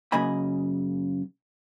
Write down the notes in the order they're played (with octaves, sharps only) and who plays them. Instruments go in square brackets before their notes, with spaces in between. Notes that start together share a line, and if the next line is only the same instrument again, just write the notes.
[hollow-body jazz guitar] F#2 C#3 A#3 D#5 G#5 B5